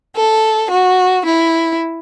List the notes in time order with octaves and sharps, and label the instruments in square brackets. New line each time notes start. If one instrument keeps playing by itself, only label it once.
[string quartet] A4
F#4
E4